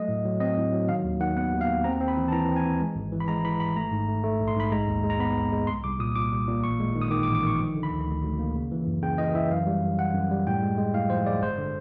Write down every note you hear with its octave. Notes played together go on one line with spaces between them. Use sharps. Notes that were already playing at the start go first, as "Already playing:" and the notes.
Already playing: F#3 A3 D#5
A2
F#3
C4 D#5
A2
F#3
D#3 F5
D#2
D#3 F#5
B3 F#5
D#2
F5
D#2
C4 A#5
C4
B5
E3
A5
E3 A#5
C4
G#5
E3
G#3
G#1
E3
B5
G#3 A#5
E3 B5
G#1 B5
A3 A#5
G#2
A3
A3
A#1
C6
G#2 B5
G#3 A#5
D#2
G#3
A#5
B3 B5
D#2
G#3
C2 C6
C2 D6
A#2 D#6
A#2 D6
G3
A#2
A1 C#6
G#3
D#3
D#6
D#3 D6
D6
A1
D6
D#3 C#6
F3
D3
B5
D2
D2
D2
A#3
C#3
E3
F#2
C#3 G5
E3 D#5
E3 E5
F#2 F5
G3
F#2
F#2 F#5
F#2
G3
A2 G5
G#3
G#3
A2 F5
F3 C5
G#3 D5
G1 C5
D3